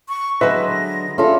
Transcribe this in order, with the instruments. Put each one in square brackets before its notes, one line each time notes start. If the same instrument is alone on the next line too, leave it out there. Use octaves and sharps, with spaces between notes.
[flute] C#6
[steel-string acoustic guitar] D3 F#3 [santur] G#3 B3 [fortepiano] B4 E5 [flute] A#6
[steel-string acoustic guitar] C#4 A4 [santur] D4 E4 F4